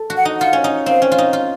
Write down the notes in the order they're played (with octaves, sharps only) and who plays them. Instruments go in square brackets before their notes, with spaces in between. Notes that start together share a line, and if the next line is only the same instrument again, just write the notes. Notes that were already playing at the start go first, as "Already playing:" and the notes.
Already playing: [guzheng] A4
F#4
[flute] F#5
[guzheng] D#4
[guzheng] F4 [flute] F#5
[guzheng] C#4
D#4
[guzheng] C4 [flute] F5
[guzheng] C#4
F4
D#4
F4